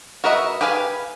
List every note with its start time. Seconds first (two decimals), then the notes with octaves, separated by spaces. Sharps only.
0.24 F#4 A#4 B4 D#5 E5
0.61 G4 G#4 B4 F5 G#5